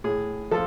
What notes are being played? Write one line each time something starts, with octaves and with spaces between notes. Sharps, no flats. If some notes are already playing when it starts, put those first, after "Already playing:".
A2 G#4
F3 A4